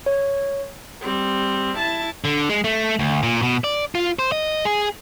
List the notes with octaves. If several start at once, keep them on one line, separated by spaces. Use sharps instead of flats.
C#5
G3 C4
E4 A5
D3
G#3
A3
D2
A#2
B2
D5
F4
C5
D#5
G#4